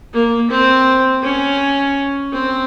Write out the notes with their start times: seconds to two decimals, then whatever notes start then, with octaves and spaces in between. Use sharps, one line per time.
0.13 A#3
0.50 C4
1.22 C#4
2.32 C4